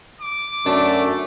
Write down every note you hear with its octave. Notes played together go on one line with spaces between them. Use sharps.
D6
F#2 A3 D4